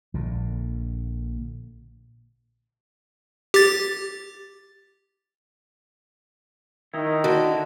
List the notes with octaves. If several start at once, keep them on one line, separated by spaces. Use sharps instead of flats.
A#1 A#2 D3
G4 A6
D#3 D#4 E4
D3 F#4